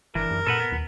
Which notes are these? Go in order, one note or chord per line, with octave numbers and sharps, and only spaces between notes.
F#1 E3 D4 A#4
F#2
A#2 A4 B4 F#5
B3
D#2